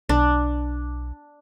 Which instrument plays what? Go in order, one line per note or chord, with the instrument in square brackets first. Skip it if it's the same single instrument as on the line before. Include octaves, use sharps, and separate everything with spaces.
[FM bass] B1 [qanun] D4